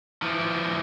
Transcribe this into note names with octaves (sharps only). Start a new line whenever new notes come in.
E3 F3